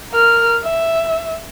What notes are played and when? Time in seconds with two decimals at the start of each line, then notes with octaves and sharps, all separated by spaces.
0.11 A#4 F6
0.63 E5